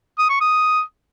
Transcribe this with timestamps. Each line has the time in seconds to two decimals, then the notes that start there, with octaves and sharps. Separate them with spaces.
0.18 D#6
0.30 C#6
0.41 D#6